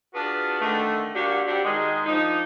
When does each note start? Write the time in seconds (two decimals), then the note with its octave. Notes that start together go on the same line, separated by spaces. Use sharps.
0.13 D4 F4 F#4 G#4 B4
0.60 D3 D#3 A3
1.14 F#3 A#3 D4 F#4 G4
1.47 G3 C4 D4 F#4 G4
1.64 D#3 G#3
2.06 F3 D4 D#4